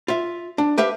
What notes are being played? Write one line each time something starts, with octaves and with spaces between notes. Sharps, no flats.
F4 E5
D4
G4 B4 E5 F5